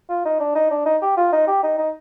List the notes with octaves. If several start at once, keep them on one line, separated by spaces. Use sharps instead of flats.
F4
D#4
D4
D#4
D4
D#4
G4
F4
D#4
G4
D#4
D#4